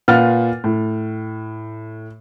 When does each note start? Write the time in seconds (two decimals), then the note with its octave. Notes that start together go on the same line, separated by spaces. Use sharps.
0.08 A#2 F4 B4 F#5 F6 A6
0.64 A2